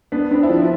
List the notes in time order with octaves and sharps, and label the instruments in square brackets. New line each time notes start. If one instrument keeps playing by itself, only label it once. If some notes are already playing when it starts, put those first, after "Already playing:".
[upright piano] B3 [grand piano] D4
[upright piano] C4 [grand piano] D4
[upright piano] E4
[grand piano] F3 [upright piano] F4